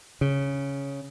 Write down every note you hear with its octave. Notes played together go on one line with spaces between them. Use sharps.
C#3